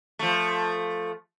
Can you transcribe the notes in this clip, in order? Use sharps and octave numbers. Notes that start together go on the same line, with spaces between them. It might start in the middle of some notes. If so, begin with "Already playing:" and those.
F3 A3